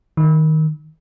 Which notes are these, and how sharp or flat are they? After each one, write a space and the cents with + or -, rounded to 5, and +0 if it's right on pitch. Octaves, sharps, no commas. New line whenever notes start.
D#3 +5